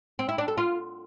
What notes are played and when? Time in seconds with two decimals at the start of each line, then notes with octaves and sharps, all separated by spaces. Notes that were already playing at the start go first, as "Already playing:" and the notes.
0.19 C4
0.29 E4
0.38 D4
0.48 A4
0.58 F4